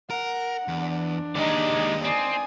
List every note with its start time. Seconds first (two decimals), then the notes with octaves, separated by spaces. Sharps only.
0.10 A#4 F#5
0.68 E2 D4
1.35 D#2 G#3 D#4 G4 D5
2.05 C4 D5 G#5 D#6